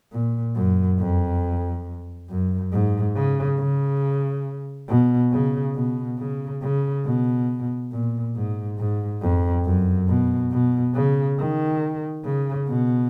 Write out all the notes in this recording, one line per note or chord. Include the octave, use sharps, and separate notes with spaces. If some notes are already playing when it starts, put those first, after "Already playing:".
A#2
F#2
F2
F#2
G#2
C#3
C#3
B2
C#3
B2
C#3
C#3
B2
A#2
G#2
G#2
F2
F#2
B2
B2
C#3
D#3
C#3
B2